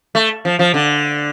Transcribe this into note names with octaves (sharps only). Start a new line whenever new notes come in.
A3
F3
F3
D3